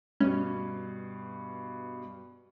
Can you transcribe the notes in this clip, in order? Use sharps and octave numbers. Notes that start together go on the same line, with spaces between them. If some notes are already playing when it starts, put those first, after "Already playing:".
G2 B2 C#4